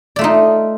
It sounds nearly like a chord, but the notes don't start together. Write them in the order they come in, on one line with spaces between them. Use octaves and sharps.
D5 A3 F4 D#4